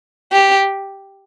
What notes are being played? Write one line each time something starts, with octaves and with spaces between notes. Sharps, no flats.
G4